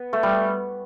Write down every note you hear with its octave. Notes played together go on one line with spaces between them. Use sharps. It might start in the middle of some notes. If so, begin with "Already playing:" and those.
Already playing: B3
A3
G3